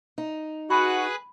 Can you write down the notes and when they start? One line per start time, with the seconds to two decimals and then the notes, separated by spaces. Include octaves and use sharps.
0.18 D#4
0.70 F#4 G#4 B4 B5 F#6